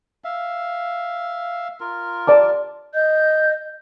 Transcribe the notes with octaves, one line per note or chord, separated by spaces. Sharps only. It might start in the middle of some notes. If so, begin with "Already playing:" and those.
E5 F5
F4 A#4
D5 A5 D6
D#5 G6